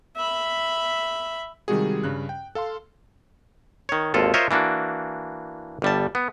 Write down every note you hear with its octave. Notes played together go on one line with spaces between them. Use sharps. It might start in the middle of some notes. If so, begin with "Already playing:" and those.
E5 B5
C3 D#3 G3 G#3 F#4 G#4
G2 C#3 F#6
G5
A4 F5 A5 C6
D#3 C#5
G#1 D#2 F4 A4
F4 A#4 C5 C#5 D#5 E5
E3 A#3 D4 F#4
G1 G3 A5
B3